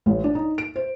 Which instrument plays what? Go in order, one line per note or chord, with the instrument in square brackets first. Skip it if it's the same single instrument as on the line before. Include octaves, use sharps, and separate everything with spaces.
[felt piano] A1
D4
D#4
D7
C5